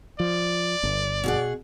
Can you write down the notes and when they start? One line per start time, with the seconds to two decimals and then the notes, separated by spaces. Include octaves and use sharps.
0.20 F3 D5
0.83 G1
1.24 B2 G#4 F#5